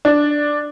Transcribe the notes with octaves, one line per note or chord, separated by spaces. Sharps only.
D4